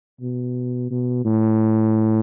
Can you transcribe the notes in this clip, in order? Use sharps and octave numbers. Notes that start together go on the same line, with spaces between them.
B2
B2
A2